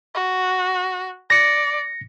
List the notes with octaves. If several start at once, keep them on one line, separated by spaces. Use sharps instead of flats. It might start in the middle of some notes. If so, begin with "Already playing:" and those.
F#4
D5 A#6 C#7